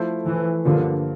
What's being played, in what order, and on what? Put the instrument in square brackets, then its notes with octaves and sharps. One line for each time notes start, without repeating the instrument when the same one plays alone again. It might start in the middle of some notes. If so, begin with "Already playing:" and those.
Already playing: [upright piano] F3 A3 E4 A4 C5
[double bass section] E3
[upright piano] G2 F3 A#3 F4 [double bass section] D3